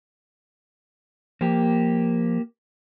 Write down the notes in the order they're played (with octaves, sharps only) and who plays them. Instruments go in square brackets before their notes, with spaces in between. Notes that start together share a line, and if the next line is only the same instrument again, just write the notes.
[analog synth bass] F3 [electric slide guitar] A#3 G4